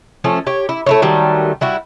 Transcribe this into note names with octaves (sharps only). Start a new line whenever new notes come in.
F3 A3 C#4
G4 C#5
E4
A3 E4 C#5
D#3 F#3 G3 A3
G3 E4 F#4